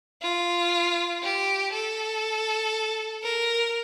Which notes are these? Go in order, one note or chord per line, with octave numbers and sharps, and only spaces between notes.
F4
G4
A4
A#4